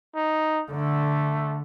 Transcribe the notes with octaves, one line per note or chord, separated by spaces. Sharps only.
D#4
D3 A3